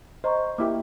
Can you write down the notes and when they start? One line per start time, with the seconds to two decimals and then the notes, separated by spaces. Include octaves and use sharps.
0.24 C5 D#5 A#5 C#6
0.58 A#3 E4 G4 E5 D6